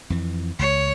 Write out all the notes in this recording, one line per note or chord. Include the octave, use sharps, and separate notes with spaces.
F2 E3
C#2 C#5